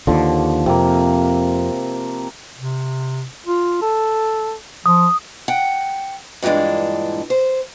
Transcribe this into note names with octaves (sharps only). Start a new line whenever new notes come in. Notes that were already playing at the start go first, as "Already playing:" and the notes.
D#2 D3 F3
F2 C3 A#3
C3
F4
A4
F3 D#6
F#5 G5
G2 A#2 E3 G#3 D4
C5